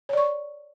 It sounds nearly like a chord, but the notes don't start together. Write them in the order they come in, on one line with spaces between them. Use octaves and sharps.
C#5 D5 C#6